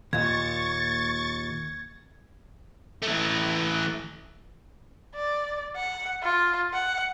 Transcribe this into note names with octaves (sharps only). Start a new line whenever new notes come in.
D#2 A#2 C#6 G#6 A6
E3 A3
D5
F#5
F4
F#5